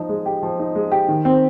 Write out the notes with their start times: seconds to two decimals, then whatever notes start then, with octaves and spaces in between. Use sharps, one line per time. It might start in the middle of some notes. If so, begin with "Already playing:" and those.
Already playing: F3 D#4
0.09 G#3
0.26 G4
0.43 F3
0.60 D#4
0.75 G#3
0.92 G4
1.09 D#3
1.25 C4